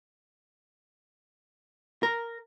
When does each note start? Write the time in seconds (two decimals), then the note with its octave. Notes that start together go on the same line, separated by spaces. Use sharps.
2.03 A#4